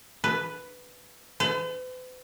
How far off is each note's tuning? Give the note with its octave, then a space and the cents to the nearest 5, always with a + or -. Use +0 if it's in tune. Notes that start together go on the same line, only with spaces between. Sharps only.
B4 +5
B4 +45